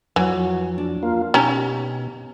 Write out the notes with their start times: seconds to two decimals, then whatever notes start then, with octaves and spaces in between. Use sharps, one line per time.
0.16 F2 E3 F#3 F#4
0.78 D4
1.03 A#3 F4
1.34 B2 C#4 D#4 G4 A#5